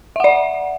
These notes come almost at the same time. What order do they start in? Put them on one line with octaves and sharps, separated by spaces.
E5 F#5 D5